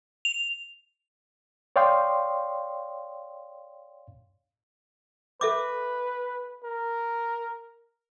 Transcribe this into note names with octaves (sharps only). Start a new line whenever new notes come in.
F7
C#5 D5 F5 G5 C6 D#6
A4 B4 E5 D6
A#4